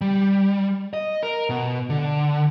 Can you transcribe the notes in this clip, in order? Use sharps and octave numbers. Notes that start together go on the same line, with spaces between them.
G3
D#5
A#4
B2
D3